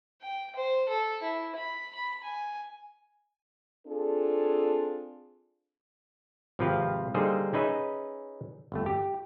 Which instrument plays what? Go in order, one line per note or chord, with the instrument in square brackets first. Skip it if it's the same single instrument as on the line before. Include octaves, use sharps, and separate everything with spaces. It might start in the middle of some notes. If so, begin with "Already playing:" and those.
[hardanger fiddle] G5
C5
A4
E4
B5
B5
G#5
[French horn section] C4 D4 F4 G#4 A4
[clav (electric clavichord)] G#1 C3 F3 C4 B4 F5
D3 G3 A#3 D#4 G#4 C5
C#4 D#4 G#4 B4 D#5 E5
G1 F2 A3
G4